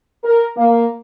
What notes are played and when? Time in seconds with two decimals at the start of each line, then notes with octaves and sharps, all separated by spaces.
0.24 A#4
0.57 A#3